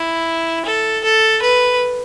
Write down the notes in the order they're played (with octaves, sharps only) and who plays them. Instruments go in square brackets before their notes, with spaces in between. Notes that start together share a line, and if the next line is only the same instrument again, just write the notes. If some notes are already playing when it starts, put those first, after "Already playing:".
Already playing: [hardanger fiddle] E4
A4
A4
B4